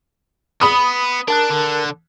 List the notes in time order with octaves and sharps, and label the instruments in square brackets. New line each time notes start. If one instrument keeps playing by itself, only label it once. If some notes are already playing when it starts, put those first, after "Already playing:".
[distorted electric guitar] B3 [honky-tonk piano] B5 D#6
[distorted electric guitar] D4 [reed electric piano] A#4 A5 F#6
[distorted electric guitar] D3